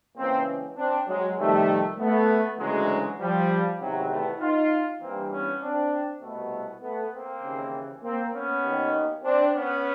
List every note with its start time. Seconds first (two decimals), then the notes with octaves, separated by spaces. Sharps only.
0.17 C#2 C#3 E3 A#3 C4
0.77 C4 D4
1.08 F#3 G#3
1.38 F2 C3 D#3 G3 A3
1.98 A3 B3
2.59 D2 C#3 E3 F#3 G#3
3.20 F3 G3
3.80 E2 C3 D#3 F#3
4.10 A3 B3
4.40 D#4 F4
5.01 G2 E3 A#3 C4
5.31 B3 C#4
5.61 C4 D4
6.22 C2 B2 A3 B3
6.83 A3 B3
7.13 A#3 C4
7.43 D#2 C#3 E3
8.03 A#3 C4
8.33 B3 C#4
8.63 D#2 D#3
9.24 C4 D4
9.54 B3 C#4